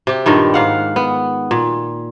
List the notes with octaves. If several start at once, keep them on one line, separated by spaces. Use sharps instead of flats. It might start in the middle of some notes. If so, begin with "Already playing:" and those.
C3 G4
G2 A#2 D#3 G3
G#2 F5 F#5
B3
A#2